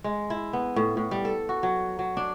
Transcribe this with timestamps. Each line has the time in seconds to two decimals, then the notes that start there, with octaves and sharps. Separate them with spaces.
0.04 G#3
0.30 E4
0.53 B3
0.76 A2
0.97 A2
1.11 G3
1.25 A4
1.49 F#4
1.63 F#3
1.99 F#3
2.17 D4